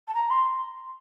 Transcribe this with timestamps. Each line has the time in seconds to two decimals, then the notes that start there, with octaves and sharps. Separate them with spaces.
0.07 A5
0.14 A#5
0.30 C6